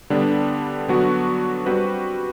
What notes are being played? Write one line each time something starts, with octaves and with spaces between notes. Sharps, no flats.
D3 G3 B3 D4
D3 F#3 B3 D4 F#4
G3 C4 F#4 B4